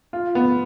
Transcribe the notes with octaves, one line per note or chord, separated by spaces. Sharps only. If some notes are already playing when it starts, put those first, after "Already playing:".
F4
B3